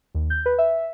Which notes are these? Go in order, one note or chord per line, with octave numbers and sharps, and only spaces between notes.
D#2
G6
B4
E5